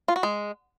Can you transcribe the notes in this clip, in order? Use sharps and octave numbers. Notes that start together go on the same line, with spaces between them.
F4
F#4
G#3